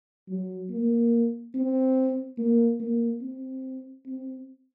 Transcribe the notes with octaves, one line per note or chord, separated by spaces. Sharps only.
F#3
A#3
C4
A#3
A#3
C4
C4